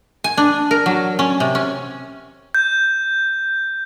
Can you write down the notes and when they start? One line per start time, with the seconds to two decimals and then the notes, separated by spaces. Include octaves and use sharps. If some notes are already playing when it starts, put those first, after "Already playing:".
0.24 G#5
0.37 D4
0.71 A#4
0.86 F#3
1.19 C#4
1.40 C3
1.55 C#4
2.54 G6